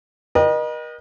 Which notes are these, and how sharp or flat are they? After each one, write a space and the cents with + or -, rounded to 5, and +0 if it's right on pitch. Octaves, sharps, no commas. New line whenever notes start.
A#4 +45 D#5 -25 G5 +0